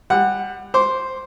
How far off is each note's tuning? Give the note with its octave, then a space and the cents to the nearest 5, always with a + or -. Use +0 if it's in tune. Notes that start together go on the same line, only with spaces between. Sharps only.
G3 +25 F#5 +0
C5 +0 D6 -30